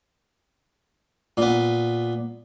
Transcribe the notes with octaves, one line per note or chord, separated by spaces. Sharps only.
A#2 B3